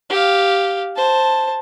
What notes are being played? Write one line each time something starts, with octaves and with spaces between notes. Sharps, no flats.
G4 F5
C5 A5